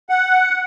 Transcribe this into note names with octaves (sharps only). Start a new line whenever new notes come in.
F#5